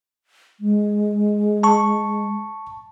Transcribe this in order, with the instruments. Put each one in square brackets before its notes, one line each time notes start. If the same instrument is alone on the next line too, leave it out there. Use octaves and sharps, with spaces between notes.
[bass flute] G#3
[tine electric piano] A5 C#6